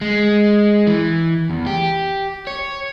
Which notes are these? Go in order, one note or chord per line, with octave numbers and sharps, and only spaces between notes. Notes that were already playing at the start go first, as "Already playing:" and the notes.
G#3
E3
E2
G4
C#5